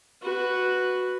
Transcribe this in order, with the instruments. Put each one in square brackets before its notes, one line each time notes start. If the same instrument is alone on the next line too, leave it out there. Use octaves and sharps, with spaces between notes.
[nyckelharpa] F#4 B4